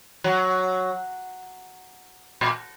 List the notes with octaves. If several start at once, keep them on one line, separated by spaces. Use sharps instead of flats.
F#3
A#2